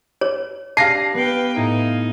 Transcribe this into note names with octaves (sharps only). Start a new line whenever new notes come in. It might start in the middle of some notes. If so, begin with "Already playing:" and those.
C#5
D4 G4 F5 A5 A#6 C7
B3 B4 G5
A2 D#4 E4 G#6